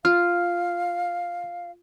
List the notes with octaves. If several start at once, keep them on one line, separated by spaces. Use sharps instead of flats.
F4 F5 F6